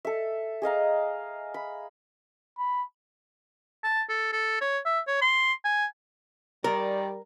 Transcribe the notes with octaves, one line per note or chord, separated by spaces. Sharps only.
A4 E5
G#4 D#5 F5 A#5
B5
B5
A5
A4
A4
C#5
E5
C#5
C6
G#5
D#3 G3 A#4 D5